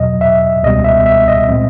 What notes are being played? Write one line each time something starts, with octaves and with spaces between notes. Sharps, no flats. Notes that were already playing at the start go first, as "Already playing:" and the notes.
Already playing: E2 B2 F#3 D#5
E5
C#2 B2 G3 B3 D#5
E5
E5
D#5
A#2 F3 G#3 C4